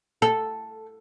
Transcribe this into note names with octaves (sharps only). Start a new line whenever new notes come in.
A4